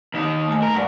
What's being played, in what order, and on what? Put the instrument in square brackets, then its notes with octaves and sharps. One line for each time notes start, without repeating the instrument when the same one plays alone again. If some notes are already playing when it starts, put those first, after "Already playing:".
[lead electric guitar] D#2 D#4
[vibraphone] A3 G#5
[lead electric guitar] A#4
[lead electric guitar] G2 [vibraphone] D5 F#5 C#6